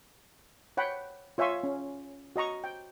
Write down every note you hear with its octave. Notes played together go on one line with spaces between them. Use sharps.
C#5 F#5 G5 B5
F4 C#5 E5 G#5 C6 C#6
C#4
F#4 D#5 A#5 C#6
G5